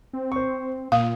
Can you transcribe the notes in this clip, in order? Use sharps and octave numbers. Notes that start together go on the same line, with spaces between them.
C4
C5 C#6
A#2 F5 D#6